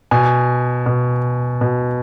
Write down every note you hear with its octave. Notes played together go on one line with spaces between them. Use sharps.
B2 G#5
B2
B2